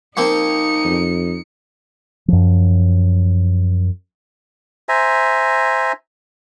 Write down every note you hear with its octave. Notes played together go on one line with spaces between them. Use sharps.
F3 A#3 C4 D#4 C#7
F2
F#2 F3
C5 E5 G#5 A#5